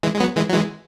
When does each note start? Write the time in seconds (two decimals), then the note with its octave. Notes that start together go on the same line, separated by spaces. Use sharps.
0.03 E3 G#3
0.14 G#3
0.20 F#3 B3
0.36 E3 G#3
0.49 F#3
0.53 E3 G#3